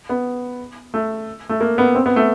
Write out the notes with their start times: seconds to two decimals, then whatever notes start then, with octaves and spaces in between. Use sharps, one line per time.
0.09 B3
0.94 A3
1.49 A3
1.61 A#3
1.78 B3
1.95 C4
2.06 B3
2.16 A3